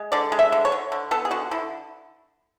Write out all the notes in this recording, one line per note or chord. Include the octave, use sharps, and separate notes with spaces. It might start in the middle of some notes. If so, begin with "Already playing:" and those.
Already playing: G#3
D3 D5
G#3
E5
D3
C#5
D3
D3
B3 A4
G#4
D3 F#4
D3 E4